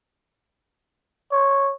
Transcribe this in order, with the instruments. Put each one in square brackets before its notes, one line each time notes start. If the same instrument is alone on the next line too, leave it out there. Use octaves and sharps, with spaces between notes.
[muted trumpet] C#5